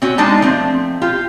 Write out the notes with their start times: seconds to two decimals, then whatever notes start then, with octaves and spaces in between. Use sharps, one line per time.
0.02 C4 C#4 F#4
0.18 G#3 D4 D#4 A5
0.42 F3 A3 C4
1.02 F4 G4